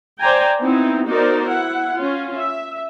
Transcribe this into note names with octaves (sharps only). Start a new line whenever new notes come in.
C5 D5 G5 G#5 A#5
B3 C4 D#4 E4
B3 D#4 F#4 A#4 C5 D5
E4 F#5
C#4 F4
E5